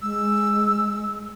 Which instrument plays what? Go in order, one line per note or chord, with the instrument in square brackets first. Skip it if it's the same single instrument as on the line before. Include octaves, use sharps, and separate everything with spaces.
[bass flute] G#3 [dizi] E6